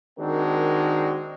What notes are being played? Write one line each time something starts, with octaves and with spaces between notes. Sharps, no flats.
D#3 G#3 C4 D4 F#4 A#4